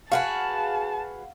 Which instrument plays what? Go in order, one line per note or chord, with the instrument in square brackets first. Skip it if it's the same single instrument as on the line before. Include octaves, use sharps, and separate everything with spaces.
[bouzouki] F#4 G#4 B4 [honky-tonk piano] F5 F#5 [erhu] A5